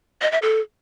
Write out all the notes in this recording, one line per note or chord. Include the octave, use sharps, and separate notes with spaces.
D#5
E5
A4